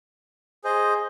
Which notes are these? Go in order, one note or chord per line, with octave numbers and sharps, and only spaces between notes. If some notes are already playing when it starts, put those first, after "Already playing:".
G#4 C5 D#5